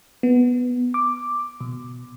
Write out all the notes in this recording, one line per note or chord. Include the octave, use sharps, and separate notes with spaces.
B3
D6
B2